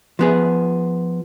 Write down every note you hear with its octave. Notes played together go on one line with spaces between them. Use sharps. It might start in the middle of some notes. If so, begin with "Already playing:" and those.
F3 B3 G#4